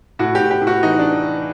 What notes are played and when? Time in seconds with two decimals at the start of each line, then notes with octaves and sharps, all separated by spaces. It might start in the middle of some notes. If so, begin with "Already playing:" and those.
0.19 A2 F#4
0.35 G4
0.41 A2
0.51 G4
0.61 A2
0.67 F#4
0.83 E3 D#4
0.99 D4